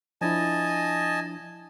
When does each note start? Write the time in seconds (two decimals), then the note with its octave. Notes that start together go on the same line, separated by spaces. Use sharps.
0.21 F3 D4 E4 D#5 G#5 A5